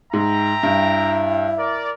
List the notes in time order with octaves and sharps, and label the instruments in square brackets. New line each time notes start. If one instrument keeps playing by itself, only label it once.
[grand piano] G#2 [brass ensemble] E5 G5 A#5
[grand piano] G2 [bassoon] E4
[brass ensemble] A#4 D5